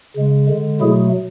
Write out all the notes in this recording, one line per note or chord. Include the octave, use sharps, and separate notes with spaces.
C#3 G#3
D3 G#3
B2 F#3 A3 E4 G#4